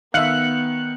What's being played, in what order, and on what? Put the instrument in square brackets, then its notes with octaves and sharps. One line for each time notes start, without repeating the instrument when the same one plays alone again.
[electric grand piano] D#3 [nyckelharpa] B3 [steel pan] E5 F5 [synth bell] F#6 C#7 F#7